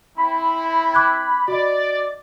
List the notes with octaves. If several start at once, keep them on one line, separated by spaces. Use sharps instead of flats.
C4 E4 B5
D6 F#6 G#6
F#4 D5 D#5